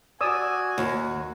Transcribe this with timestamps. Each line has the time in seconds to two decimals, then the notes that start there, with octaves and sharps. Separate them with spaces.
0.21 F#4 D5 G#5 D#6 E6
0.78 D#2